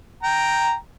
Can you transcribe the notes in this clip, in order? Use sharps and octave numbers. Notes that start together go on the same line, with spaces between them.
G5 A#5